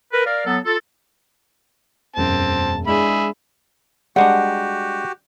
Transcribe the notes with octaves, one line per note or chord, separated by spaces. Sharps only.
A#4 B4
A#4 D5 F5
F#3 B3 A4
F4 A4
E1 F#2 C4 A5
G#3 D4 G#4 E5 B5
G3 G#3 D4 F#4 G4 F#5